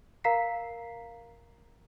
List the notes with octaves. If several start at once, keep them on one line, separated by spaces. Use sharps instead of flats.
A#4 F5 A#5 B6 C7